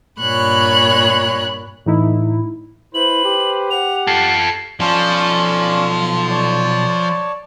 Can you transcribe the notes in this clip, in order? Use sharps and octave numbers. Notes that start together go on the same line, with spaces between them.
G2 A#2 C#5 B5 F#6
A2 E3 D#4 E4
E4 B4 C5 F#7
G4
F#5 F7
F4 A4 C7
B1 F3 C#4 A4 D5 F5 C6
C#5 D5 A5